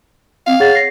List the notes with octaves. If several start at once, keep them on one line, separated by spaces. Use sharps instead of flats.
C4 F5
G#4 C#5 F#5 A6
A#6 C7